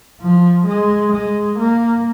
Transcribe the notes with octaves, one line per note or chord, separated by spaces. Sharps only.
F3
G#3
G#3
A#3